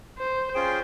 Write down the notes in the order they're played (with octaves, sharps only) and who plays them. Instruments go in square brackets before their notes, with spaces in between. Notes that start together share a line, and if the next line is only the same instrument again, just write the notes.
[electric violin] C5
[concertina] C#4 F4 G#4 C5 G5